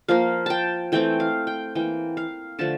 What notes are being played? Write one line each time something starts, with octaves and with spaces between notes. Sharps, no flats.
F3 A#3 F5
G5 A5
E3 A3 C4 G5
F5
G5
E3 A#3 G5
F5
D3 F3 A3 A5